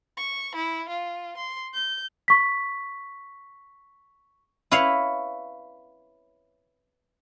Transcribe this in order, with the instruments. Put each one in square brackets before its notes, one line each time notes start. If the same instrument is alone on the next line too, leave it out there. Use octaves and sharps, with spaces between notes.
[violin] C#6
E4
F4
C6
G6
[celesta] C#6 B6
[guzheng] E4 B4 C#5 F5